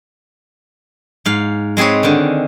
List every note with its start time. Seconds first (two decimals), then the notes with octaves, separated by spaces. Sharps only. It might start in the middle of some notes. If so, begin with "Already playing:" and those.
1.26 G#2 F5
1.77 G#3 C4 G#4 B4 C#5
2.03 D3 D#3